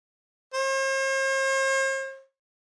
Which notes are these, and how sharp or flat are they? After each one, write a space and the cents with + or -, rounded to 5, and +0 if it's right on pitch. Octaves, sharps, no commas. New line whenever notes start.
C5 +45